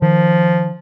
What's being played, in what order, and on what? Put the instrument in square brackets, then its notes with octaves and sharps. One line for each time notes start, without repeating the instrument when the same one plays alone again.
[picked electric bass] D#3 [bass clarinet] F3